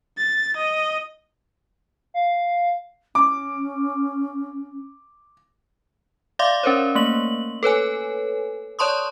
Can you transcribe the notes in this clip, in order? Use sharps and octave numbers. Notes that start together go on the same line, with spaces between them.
A6
D#5
F5
C#4 D6
D5 E5 F5 C6 D6
C#4 A#4 C5 C#5
A3 A#3 F#7
A4 B4 C#5 G#5
C#5 D5 A5 C6 C#6 D#6